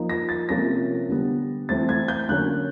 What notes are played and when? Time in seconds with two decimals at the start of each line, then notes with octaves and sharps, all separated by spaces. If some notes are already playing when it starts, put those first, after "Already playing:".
Already playing: F3 A#3 D#4
0.09 A#6
0.29 A6
0.49 C3 F3 A#3 C#4 E4 A#6
1.09 D3 G3 B3
1.69 E3 A3 C4 A6
1.89 G#6
2.08 G6
2.29 D3 F#3 A#3 C#4 F#6